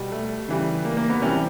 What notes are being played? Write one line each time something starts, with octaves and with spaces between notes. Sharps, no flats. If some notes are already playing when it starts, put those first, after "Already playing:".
Already playing: B2 G3
A3
C#3 E3 G3
A#3
A#3
B3
C3 E3 G3 C#4